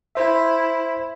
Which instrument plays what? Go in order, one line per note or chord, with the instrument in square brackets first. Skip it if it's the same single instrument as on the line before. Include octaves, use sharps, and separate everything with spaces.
[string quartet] E4 [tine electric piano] C5 E5